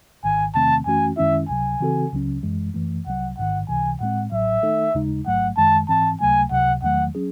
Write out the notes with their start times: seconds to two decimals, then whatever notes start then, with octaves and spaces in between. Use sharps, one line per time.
0.24 G#1 G#2 D#3 G#5
0.54 E2 C3 D#3 A3 C4 A5
0.86 F#2 E3 A3 C#4 F#4 G#5
1.17 F#2 D#3 G#3 C#4 E4 E5
1.49 C#2 C3 F#3 G#5
1.80 C#3 E3 C4 F#4 A4
2.13 C#2 C#3 F#3 C#4
2.43 F#2 E3 G#3
2.74 F#2 E3 A3
3.07 C2 C3 F#3 F#5
3.38 A1 G#2 D#3 F#5
3.69 C#2 C3 E3 G#5
4.01 A2 G#3 C4 F#5
4.32 A1 A2 F#3 E5
4.63 D#3 A3 D#4 A4
4.94 D#2 C#3 G#3 D#4
5.26 A1 G#2 F#3 A3 F#5
5.57 F#2 D#3 G#3 A5
5.89 G#2 E3 C4 A5
6.20 C#2 C3 F#3 A3 G#5
6.51 C#2 C3 F#3 F#5
6.82 E2 D#3 F#3 A3 F#5
7.15 F#3 C#4 G#4